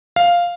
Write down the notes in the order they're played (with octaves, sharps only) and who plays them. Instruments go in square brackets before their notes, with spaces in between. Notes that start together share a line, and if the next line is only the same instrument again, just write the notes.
[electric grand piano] F5